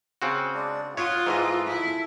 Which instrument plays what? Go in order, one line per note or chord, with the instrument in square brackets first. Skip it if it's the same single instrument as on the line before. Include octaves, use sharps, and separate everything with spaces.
[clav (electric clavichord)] C#3 C4 F#4
[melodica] G#3 D4 D5
[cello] F4 [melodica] F#4 F#5 D#6 [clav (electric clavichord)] C#5
[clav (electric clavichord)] G#2 E3 D#5 [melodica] A4
[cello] E4